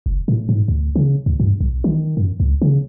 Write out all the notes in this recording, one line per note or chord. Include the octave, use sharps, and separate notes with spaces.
F#1
A2
G#2
D2
C#3
D2
G2
B1
D#3
F#2
C#2
C#3